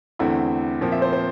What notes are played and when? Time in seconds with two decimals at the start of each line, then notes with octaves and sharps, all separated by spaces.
0.19 E2 D3 A3 C4 E4
0.81 A#2 F3 C4
0.92 E5
1.02 C5
1.13 C5